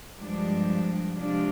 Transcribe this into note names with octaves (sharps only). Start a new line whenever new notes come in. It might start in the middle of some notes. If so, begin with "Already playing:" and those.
G2 F3 G#3 D4
C3 F3 G#3 D4 F4